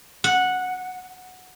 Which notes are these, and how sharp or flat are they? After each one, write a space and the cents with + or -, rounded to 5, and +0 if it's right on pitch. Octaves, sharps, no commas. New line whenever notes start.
F#5 -10